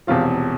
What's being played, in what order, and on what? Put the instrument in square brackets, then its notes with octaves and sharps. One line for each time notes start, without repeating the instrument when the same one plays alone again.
[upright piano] E1 E2 C3 F3 F4